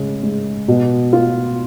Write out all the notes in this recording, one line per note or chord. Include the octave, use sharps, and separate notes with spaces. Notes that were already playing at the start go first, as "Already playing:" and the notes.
Already playing: C#3 G#3
G#3
B2
F4